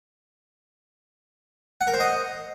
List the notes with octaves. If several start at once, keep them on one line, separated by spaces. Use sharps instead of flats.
F#5
A#4
C5
D#5